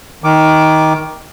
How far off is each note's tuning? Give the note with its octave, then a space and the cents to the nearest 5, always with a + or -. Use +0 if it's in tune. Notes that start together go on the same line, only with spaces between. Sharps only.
D#3 +15 D6 +0